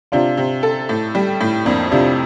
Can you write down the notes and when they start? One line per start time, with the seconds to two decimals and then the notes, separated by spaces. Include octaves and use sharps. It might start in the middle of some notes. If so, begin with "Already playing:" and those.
0.12 C3 D4 F4
0.37 C3
0.63 A4
0.89 A2
1.15 G3
1.40 A2
1.65 F2 A#3 D4
1.91 C3 D4 F4